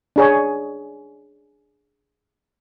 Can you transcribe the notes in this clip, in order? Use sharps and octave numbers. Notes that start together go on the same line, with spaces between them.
D4 G#4 C#5